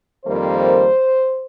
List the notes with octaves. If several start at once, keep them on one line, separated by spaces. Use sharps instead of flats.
F2 D#3 G3 A#3 C5